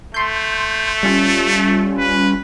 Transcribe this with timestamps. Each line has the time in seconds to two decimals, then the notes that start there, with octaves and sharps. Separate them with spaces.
0.14 A3 C6 G6
1.03 G3 C#4 F4
1.98 B4